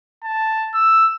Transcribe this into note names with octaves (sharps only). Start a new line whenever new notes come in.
A5
E6